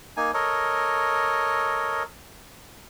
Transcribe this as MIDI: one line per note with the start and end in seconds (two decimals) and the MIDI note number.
0.17 0.31 58
0.17 0.31 63
0.17 0.31 80
0.34 2.03 69
0.34 2.03 70
0.34 2.03 73
0.34 2.03 75